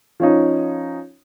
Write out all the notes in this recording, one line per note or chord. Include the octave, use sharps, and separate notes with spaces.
F3 C#4 D#4